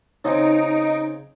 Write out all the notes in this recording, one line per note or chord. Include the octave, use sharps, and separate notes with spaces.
C#3 C4 D#4 D7